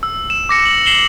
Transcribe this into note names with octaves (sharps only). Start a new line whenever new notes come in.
E6
E7
D6 A#6 C#7
F#7
C7 E7 F#7 G7